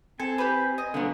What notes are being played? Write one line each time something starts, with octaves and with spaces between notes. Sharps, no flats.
C4 A4 G#5
G4 B4
D#5
D3 A#3 B3